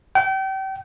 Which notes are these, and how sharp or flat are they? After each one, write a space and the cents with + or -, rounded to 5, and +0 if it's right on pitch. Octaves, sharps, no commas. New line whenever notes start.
G5 -35